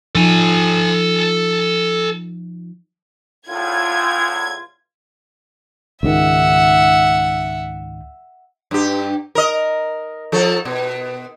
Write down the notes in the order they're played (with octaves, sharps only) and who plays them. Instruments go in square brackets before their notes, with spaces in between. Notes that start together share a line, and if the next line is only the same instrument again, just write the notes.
[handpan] F3 D#4 F4 [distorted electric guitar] A4 G#5
[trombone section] E2 A2 [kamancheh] F4 [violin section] G#6
[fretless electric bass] C#2 G#2 D#3 [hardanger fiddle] E5 F#5
[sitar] G2 G4
A#4 D#5
F3 A4
B2